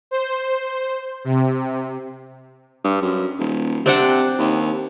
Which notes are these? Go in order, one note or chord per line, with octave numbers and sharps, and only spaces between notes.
C5
C3
G2
F#2
D#1
C3 C4 D4 F#5
D#2